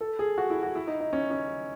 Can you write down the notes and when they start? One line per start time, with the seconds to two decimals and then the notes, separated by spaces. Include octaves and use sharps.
0.01 A4
0.19 G#4
0.38 F#4
0.50 E4
0.63 F#4
0.75 E4
0.87 D#4
1.00 D#4
1.13 C#4
1.31 C#4